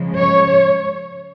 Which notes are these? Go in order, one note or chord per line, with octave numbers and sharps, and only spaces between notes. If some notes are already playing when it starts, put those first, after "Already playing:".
Already playing: C#3 F3 G#3
C#5